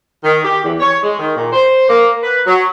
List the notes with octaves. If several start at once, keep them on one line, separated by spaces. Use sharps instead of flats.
D#3
G4
E2
C#5
G#3
D#3
A#2
C5
A#3
B4
F#3